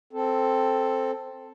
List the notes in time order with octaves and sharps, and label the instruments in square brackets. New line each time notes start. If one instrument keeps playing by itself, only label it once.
[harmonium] C4 A4